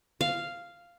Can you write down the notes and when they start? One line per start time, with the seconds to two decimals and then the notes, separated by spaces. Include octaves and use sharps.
0.21 F5